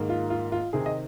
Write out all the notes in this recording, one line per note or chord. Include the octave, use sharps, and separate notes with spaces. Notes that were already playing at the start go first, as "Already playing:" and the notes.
Already playing: G#2 D#3 A#3
F4
F4
F4
C3 D#3 C4 G#4
D#5